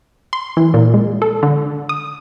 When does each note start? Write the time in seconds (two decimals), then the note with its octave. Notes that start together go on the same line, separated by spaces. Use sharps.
0.33 C6
0.57 E3
0.74 A#2
0.94 G#3
1.22 A4
1.43 D3
1.89 D#6